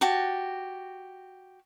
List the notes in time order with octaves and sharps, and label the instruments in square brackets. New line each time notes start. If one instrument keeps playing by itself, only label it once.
[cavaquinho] F#4 G4 A5